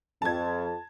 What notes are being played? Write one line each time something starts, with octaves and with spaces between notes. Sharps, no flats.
F2 A5 G#6